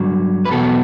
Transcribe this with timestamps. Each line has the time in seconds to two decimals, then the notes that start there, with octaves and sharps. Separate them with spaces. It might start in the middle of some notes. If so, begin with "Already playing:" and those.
Already playing: G2 D3 F#3
0.45 B4
0.50 E2 B2 F#3 B3 A4